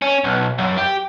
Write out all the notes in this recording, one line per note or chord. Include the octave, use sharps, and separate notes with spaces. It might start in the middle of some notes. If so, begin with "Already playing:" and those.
C#4
B1
F#2
G4